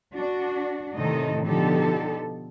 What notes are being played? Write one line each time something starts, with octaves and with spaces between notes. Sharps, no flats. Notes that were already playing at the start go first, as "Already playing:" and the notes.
D4 F#4
A2 C3 D#3 D#4 A4 D#5
B2 D3 F3 D#4 G4 A4